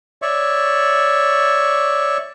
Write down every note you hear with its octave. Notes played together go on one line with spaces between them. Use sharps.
C#5 D5 E5 C#6